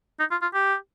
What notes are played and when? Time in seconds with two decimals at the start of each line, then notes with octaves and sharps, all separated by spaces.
0.19 D#4
0.31 F4
0.42 F4
0.54 G4